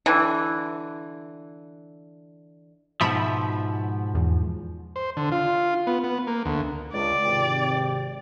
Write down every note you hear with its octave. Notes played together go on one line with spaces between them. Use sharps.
D3 E3
G#2 B2 F3 E5 B5
E2
C5
D3
F4
B3
B3
A#3
D2
C#2 D5
G#1 C3 G5